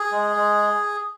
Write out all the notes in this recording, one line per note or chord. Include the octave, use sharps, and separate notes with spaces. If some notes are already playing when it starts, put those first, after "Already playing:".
Already playing: G#4
G#3
G#3